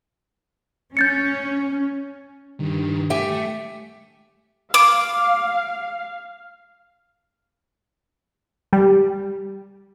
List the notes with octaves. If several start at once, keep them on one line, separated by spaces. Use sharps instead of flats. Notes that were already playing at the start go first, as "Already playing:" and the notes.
C#4 G6 A6 C#7
G2 D#3 E3
A3 G4 E5 G#5
F5 D6
G3